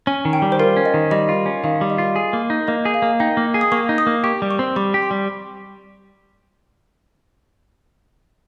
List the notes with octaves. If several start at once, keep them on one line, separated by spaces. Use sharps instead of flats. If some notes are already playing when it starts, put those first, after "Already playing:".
C#4 G#5
D#3
G5
G3
C5
F4 A#4
C#4
D#5
D#3
G3 D#5
F4
C#4
D#3 F5
G3
D#5
F4
G#4
A#3
D#4
A#3 D#5
G#4
F5
A#3
D#4 G5
A#3
G#4
D#6
A#3 C#6
D#4
D#6
A#3
G4 C#6
G3
C#6
C4
G3 C#6
G4
C6
G3